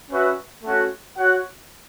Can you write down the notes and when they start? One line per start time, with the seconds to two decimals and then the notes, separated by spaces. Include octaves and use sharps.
0.10 C#4 F#4 B4 E5
0.63 A3 C#4 F#4
1.17 F#4 C#5 F#5